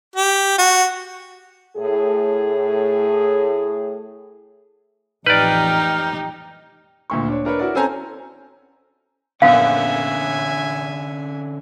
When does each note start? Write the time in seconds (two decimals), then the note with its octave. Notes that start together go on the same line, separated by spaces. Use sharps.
0.16 G4
0.58 F#4
1.77 A2 G#4
5.26 A1 F2 D#4 G4 B4 D5 F6 G6
7.10 D2 A#2 C#6
7.28 D4 C#5
7.45 D4 A#4 B4 C#5
7.59 E4 F#4 A#4 D5
7.74 C4 C#4 A4 C5 G#5 A#5
9.42 A#1 F#2 D3 B3 C#4 E5 F5 G#5